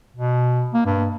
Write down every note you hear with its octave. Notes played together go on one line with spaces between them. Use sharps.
B2
A#3
G2